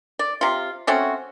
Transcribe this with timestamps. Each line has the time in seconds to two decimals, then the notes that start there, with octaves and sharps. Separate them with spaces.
0.19 D5
0.41 C3 F4
0.87 A3 C4 C#4 F#4